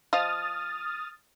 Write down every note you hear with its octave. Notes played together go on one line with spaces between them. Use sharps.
F3 D#5 F5 D#6 F6 A6